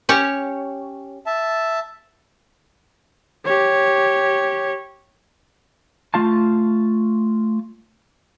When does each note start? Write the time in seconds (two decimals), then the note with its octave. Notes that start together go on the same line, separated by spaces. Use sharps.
0.09 C#4 G4 C#5
1.26 E5 A5
3.45 G4 C#5
6.14 A3 F4 F5 A5